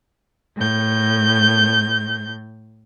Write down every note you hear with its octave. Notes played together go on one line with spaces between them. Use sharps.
A2 G6